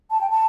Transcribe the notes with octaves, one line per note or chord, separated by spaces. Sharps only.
A5
G5
A5